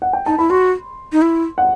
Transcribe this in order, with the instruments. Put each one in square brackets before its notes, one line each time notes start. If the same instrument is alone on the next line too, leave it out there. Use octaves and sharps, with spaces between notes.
[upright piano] F#5
G5
[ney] D#4 [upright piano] A5
[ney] E4 [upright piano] B5
[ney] F#4 [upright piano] C6
[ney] D#4
E4
[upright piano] F#5